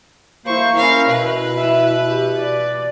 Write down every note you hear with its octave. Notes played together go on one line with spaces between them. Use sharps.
A#3 E4 C5 C#6
C#4 E4 A#4 F5 G#5
B2 E4 B4
E4 E5
G4
D5